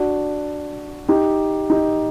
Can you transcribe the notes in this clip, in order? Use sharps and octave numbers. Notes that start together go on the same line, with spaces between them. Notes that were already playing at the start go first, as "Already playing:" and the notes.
Already playing: D4 F#4
D#4 G4
D#4 G4